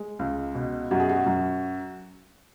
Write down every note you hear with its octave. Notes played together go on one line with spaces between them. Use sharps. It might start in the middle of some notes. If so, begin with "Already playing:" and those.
Already playing: G#3
C#2
B2
F#2 F#4
G#4
F#4
F#2